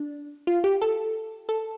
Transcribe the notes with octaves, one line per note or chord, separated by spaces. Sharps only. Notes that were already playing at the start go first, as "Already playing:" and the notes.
Already playing: D4
F4
G4
A4
A4